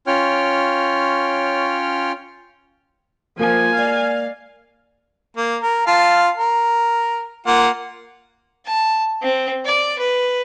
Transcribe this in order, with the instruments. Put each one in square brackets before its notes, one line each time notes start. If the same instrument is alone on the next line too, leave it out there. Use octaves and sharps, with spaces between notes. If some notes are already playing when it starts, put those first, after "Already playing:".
[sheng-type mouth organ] C#4 F4 C#5 G5 F6
[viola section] F3 [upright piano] A#3 [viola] G#5
[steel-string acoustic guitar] G#3 D5 D#5 [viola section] F5
[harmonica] A#3
A#4
F4 F5 A5
A#4
A#3 F4 F#5
[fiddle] A5
C4
D5
B4